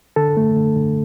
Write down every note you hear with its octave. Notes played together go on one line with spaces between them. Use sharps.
D3 A4
A3
D3
D3